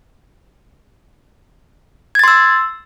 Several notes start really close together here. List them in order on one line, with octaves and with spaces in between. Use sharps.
G#6 A6 C6 E6